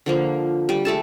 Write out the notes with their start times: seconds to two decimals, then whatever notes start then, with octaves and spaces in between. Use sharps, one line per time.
0.06 D3 F3 A#3
0.69 G3
0.85 G#3 A3 A4 A5